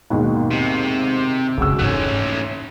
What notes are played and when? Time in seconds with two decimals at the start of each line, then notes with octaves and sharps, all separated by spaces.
0.10 D#2 G#2 B2
0.51 C3
1.58 F#1 C#2 D#3 F#4 E6
1.79 G#2 A3 A#3 C#4 F#6